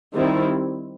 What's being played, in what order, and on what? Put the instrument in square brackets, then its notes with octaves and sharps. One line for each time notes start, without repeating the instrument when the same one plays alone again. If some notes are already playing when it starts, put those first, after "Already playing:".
[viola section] D#3 G3 C4 E4